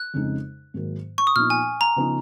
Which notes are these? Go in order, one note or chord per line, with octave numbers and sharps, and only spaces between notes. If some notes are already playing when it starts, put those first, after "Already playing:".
Already playing: F#6
F2 C#3 G#3 D#4
G#2 D#3 F#3 A#3
C#6
D#6
A#2 F3 B3 D#4 F6
G#5
A#5
C#3 F3 B3 D#4